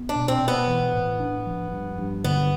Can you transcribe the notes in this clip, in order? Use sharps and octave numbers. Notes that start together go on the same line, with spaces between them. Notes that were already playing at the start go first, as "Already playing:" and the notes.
Already playing: B3
D4
B2
C4
B2
B3
E3
A2
D4
F3
G2
G2
D3 B3